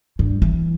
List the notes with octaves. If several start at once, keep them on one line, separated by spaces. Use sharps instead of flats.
G2
E3